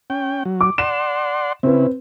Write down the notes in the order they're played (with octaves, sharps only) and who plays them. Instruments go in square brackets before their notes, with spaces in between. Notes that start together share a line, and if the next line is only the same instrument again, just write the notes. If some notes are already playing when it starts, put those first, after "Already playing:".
[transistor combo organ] C#4 G5
F#3
[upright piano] D6
[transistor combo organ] D5 F#5 C6 [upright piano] E7
[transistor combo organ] C#3 E4 [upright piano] C4 B4